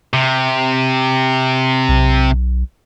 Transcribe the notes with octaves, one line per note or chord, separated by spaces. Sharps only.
C3
B1